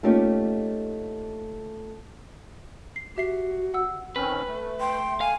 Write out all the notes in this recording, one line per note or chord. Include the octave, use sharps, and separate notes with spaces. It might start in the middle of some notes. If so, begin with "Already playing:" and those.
A3 A#3 C#4 D#4 F4 G4
C7
F#4 G4 E5 C7
F#5 E6
D#3 C4 C#4 B4
A3
G5 C6
F5 G#5